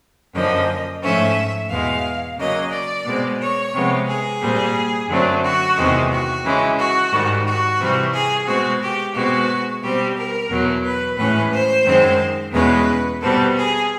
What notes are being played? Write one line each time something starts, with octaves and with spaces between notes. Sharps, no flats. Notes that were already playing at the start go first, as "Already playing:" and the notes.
F#2 D3 F3 A#3 D#5
G#2 F3 A3 C#4 E5
E2 B2 G#3 F5
C#3 F#3 A#3 D#5
D5
B2 G#3 C4
C#5
C3 F3 G#3 B3
G#4
A#2 G3 C4
F#2 D3 F#3 A3 C4
F#4
E2 C3 D#3 G#3
F#4
C#3 E3 G#3
F#4
G#2 D#3 G3
F#4
C3 E3 G3 C4
G#4
B2 G#3 C4 F#4
G4
B2 G#3 C4 F#4
B2 G3 C4 G4
A#4
E2 B2 F#3
B4
A2 E3 G#3 C#4 B4
C5
F#2 D#3 G#3 C4
E2 B2 G#3 C#4 B4
B2 G3 C4 A4
G#4